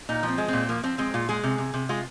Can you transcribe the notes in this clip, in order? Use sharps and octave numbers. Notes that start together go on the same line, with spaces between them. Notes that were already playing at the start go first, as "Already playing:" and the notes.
A#2 D#4
F3
C4
G#3
A#2 C4
F3 A#3
F3 C4
G#3 C4
A#2 F4
G#3 G#4
C3
C3
C3
G#3 F4